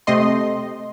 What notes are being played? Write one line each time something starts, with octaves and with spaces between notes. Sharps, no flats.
C3 A3 C4 D#5 C6